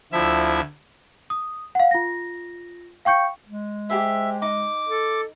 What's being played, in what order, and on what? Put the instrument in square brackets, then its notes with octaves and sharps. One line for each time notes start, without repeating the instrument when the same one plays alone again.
[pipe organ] D2 E4 E5 [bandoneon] F3
[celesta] D#6
F5 F#5
F4 A#6
F5 G5 C#6 G6 C#7
[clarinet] G#3
[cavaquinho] G4 G#4 C5 [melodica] E5
[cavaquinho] D#4 [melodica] D6
[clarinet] A4